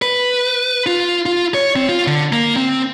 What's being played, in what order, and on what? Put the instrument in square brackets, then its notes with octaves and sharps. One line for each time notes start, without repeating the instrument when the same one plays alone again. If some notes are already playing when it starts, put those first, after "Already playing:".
[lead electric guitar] B4
F4
F4
C#5
C4
F4
D3
A#3
C4